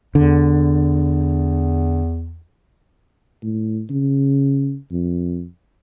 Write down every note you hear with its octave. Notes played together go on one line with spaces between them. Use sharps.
E2 D3
A2
C#3
F2